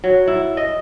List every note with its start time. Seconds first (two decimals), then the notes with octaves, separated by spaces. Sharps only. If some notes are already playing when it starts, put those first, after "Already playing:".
0.04 F#3
0.27 E4
0.57 D#5